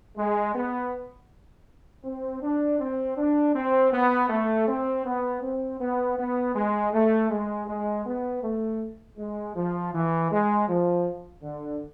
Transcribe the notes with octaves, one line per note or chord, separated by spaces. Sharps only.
G#3
B3
C4
D4
C4
D4
C4
B3
A3
C4
B3
C4
B3
B3
G#3
A3
G#3
G#3
B3
A3
G#3
F3
E3
G#3
F3
D3